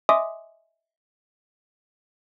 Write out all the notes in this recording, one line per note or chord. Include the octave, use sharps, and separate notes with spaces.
D#5 E5 G#5 C6 D6 D#6